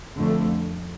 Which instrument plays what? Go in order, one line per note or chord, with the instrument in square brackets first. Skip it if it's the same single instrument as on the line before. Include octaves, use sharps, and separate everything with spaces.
[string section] F2 D3 A3